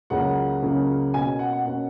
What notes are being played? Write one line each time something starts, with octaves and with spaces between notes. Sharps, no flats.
C#2 C#3 F#3 A#3 C#4 F#5
C#2 C#3 F#3 A#3 C#4
B2 A#3 C#4 G#5
F#5
F#5
B2 A#3 C#4 F#5